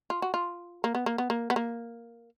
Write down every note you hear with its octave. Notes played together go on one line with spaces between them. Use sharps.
F4
F#4
F4
A#3
B3
A#3
B3
A#3
B3
A#3